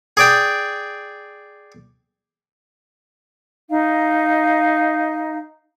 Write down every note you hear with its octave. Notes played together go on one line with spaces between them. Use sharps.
G#4 D5 G5
D#4 F5